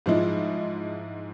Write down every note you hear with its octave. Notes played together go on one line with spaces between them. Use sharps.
G#2 F3 G#3 E4